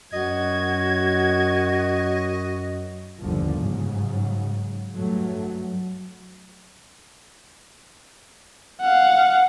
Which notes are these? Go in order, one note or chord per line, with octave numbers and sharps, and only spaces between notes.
F#2 F#4 D#5 G#6
G1 D#2 D3 F3
G#2 C#3 F#3
G2 F#3 A3
F5 F#5